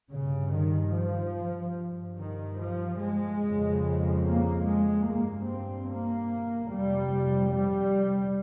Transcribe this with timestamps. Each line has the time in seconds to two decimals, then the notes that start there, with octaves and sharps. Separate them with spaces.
0.12 G2 C#3
0.54 D#3
0.95 F3
1.77 G2
2.18 D#3
2.60 F3
3.00 G#3
3.42 F2 C#3
4.24 A#3
4.65 G#3
5.06 G2 A#3
5.48 C4
5.89 A#3
6.71 F2 C3 G3
7.53 G3